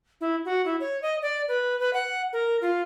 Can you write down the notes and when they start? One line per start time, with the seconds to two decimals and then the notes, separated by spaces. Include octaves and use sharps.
0.21 E4
0.45 F#4
0.65 E4
0.80 C#5
1.02 D#5
1.22 D5
1.48 B4
1.80 B4
1.93 F#5
2.33 A#4
2.61 F4